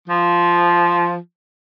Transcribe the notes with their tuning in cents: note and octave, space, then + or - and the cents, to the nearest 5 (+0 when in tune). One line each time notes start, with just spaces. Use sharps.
F3 -5